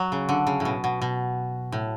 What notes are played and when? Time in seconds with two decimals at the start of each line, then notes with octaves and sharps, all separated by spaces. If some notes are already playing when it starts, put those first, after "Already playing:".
Already playing: F#3
0.12 C#3
0.29 D3
0.47 C#3
0.60 A2
0.65 B2
0.84 B2
1.02 B2
1.72 A2